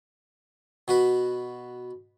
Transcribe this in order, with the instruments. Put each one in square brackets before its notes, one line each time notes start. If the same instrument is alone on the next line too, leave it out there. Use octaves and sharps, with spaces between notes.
[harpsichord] B2 F#4 B4